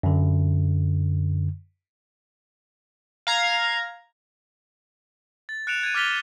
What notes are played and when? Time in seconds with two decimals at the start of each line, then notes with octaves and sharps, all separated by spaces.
0.03 F#2 D3
3.27 F5 A#5 G#6
5.49 A6
5.67 F#6 C#7 D7 E7 F7
5.83 G#6 A6 D#7
5.94 D6 F6 A6 B6 F7 G7
6.08 G7